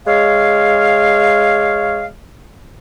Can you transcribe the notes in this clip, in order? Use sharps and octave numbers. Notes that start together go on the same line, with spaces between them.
G#3 C#5 F5